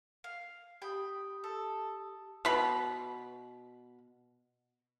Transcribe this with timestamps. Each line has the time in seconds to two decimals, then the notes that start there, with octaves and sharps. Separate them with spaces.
0.24 F5
0.82 G4 G5 B5 D#6
1.44 A4
2.45 B2 B5